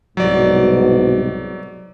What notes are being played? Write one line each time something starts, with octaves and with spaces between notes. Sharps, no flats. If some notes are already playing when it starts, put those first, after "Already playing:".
C2 G#2 B2 F#3 D5